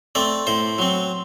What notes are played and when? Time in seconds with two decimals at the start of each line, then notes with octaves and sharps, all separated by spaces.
0.15 A3 C4 D5
0.47 A2 C5
0.78 F#3 C4